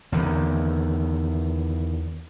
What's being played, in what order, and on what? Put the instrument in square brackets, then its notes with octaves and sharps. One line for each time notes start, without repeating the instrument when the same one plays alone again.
[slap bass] E2 D3 D#3